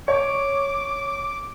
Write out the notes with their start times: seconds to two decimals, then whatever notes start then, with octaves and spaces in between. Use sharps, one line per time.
0.08 C#5 D6